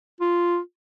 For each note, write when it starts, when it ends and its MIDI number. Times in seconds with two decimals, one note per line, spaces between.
0.21 0.58 65